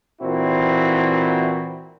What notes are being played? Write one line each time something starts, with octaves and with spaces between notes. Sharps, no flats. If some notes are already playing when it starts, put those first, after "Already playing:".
A#2 E3 C4 E4 F#4